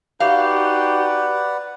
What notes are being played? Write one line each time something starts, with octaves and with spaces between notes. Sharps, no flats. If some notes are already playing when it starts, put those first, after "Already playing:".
D#4 F#4 G4 B4 D5 F5 F#5